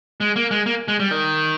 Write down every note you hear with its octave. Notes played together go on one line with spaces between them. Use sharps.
G#3
A#3
G#3
A#3
G#3
G3
D#3